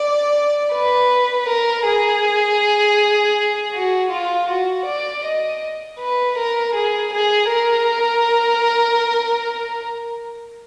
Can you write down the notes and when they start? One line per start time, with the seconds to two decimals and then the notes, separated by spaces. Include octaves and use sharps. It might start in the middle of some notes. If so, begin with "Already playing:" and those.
Already playing: D5
0.72 B4
1.47 A#4
1.86 G#4
3.73 F#4
4.11 F4
4.49 F#4
4.86 D5
5.24 D#5
5.99 B4
6.37 A#4
6.74 G#4
7.12 G#4
7.49 A#4